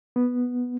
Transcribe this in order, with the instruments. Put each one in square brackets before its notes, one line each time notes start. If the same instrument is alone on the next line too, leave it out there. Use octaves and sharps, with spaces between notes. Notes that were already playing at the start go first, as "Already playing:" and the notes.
[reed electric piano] B3